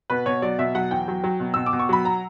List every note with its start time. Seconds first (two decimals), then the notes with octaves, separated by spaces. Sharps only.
0.10 B2 B4
0.26 B2 C#5
0.42 F#3 D5
0.59 B2 E5
0.75 F#3 F#5
0.91 E2 G5
1.08 F#3
1.24 F#3
1.40 B2
1.54 B2 E6
1.66 D6
1.73 B2
1.79 C#6
1.89 F#3 B5
2.05 A#5